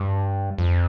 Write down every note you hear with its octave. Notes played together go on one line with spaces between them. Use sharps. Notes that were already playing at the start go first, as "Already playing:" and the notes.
Already playing: G2
F2